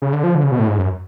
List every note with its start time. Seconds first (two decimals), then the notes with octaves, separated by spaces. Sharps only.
0.02 C#3
0.13 D3
0.24 F3
0.35 D3
0.43 C#3
0.52 B2
0.59 A2
0.68 G#2
0.78 F#2